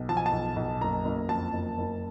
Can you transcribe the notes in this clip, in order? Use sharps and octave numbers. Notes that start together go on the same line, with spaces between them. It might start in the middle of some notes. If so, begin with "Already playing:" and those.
Already playing: B1
F3 A5
G#5
A5
B1
B1
F#1 A#5
F#1
F2 A5
F#1
F#1